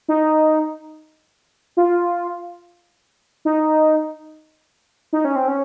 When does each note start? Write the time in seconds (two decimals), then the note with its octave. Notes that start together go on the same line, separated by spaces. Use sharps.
0.09 D#4
1.77 F4
3.45 D#4
5.13 D#4
5.25 C#4
5.36 C4
5.48 C#4